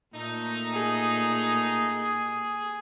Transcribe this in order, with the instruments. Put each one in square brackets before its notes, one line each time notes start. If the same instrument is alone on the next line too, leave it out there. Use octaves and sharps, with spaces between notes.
[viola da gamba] A#2 [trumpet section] A3 D#4
[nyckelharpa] G#4